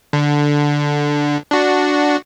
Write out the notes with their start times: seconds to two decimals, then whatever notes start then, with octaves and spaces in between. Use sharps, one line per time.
0.13 D3
1.51 D4 F#4